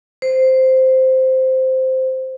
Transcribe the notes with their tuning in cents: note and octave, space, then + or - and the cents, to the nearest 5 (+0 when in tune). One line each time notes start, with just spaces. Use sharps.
C5 -5